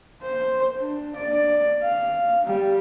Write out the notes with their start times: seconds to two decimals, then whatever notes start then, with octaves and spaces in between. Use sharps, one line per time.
0.22 C5
0.78 D4
1.16 D5
1.83 F5
2.45 G3